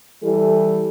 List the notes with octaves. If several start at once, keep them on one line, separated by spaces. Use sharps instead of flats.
E3 G3 A4